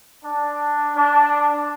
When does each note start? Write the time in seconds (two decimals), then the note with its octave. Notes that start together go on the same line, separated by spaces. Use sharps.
0.24 D4
0.96 D4